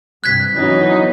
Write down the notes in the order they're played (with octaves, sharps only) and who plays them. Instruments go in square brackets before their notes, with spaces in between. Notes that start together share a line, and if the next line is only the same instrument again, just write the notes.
[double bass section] G2 C3 [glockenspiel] F#6 G#6 B6
[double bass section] E3 B3 [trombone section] F#3 C#4 [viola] D#4